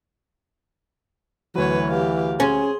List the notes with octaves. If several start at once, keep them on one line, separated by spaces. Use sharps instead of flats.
D2 E3 F#3 B4 C#5
G4 F5
C#4 G#4 C6